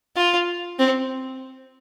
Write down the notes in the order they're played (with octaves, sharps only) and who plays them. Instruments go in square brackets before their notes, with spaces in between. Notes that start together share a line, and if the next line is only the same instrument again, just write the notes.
[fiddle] F4
C4